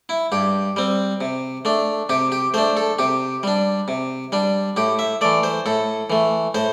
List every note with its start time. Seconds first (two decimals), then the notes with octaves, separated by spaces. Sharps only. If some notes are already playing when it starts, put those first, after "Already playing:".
0.09 E4
0.32 G2 G4
0.76 G3 C4
1.21 C3
1.65 A3 D4
2.09 C3 G4
2.32 G4
2.54 A3 D4 C5
2.77 A4
2.99 C3 G4
3.43 G3 D4
3.88 C3
4.32 G3 D4
4.77 A2 G4
4.99 E5
5.21 E3 A3 D5
5.43 C5
5.66 A2 A4
6.10 E3 A3
6.55 A2 C5